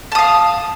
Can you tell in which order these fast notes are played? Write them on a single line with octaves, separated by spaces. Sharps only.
A5 D#6 F5